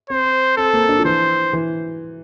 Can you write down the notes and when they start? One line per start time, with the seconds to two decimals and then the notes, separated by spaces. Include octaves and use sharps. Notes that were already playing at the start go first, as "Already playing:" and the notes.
0.10 C4 C5
0.57 C4 A4
0.73 A#3
0.89 D4
0.99 F3
1.05 E3 C5
1.53 E3